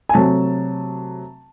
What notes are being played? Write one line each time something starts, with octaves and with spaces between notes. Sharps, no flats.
G#5
C3 F#3 A3 A5